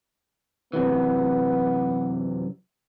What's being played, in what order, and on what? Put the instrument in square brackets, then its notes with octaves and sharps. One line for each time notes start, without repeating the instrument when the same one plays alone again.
[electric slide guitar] F#2 C3 E3 [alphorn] B3